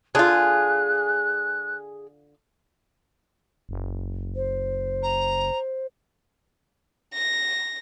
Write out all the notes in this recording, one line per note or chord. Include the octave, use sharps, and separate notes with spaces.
D3 F4 G#4 F#6
F#1
C5
A#5
A#6